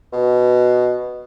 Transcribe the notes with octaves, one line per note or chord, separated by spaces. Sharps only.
B2